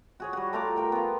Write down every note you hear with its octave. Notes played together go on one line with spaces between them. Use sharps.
F#4 G#4 C#5
G3 F#4
A3 F4 A#5 D6
A#4 G5 A#5
B3 F4